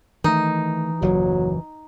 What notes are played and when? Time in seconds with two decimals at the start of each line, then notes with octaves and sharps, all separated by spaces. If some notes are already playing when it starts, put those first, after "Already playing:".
0.24 D#3 E3 A3 D#4
1.02 F#1 D#2 A#2 F#3